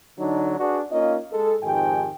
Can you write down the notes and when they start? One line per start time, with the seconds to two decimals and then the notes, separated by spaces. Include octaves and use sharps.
0.19 D3 F#3 D4 D#4
0.59 D4 F#4 G#4 B4 D5
0.91 A#3 C#4 D#4 F4 D#5
1.32 G#3 A4
1.62 F2 G#2 D#3 G4 G5 G#5